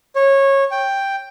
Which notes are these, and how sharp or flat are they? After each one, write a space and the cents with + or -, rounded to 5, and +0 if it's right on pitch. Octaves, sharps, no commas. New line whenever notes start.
C#5 -20
G5 +5